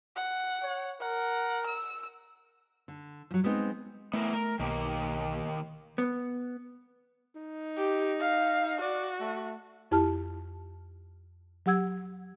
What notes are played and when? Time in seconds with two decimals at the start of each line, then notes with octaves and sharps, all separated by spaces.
0.16 F#5
0.63 C#5
1.00 A#4 F#5
1.67 E6
2.88 D3
3.31 F3 F#3
3.44 G3 G#3 B3 C4 D#4
4.14 A3 B3 E4 A#4
4.33 A#4
4.60 B1 D#3 A#3 G4
5.98 B3
7.35 D#4
7.78 G4
8.21 F5
8.81 F#4 D5
9.21 A3
9.91 F2 E4 G4 A5 F6
11.66 F#3 G4 F#5 E6 G#6